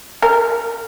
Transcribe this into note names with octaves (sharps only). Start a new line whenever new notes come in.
A#4